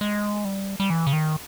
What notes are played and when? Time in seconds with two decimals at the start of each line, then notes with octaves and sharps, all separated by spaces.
0.01 G#3
0.45 G3
0.80 G3
0.90 E3
1.07 C#3
1.13 D#3